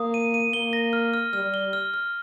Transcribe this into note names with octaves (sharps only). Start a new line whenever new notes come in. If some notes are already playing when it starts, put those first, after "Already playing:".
Already playing: A#3 D#6
D#7
D#7
A#3 G7
A#6
F6
F6
G3 F6
G7
F6
F6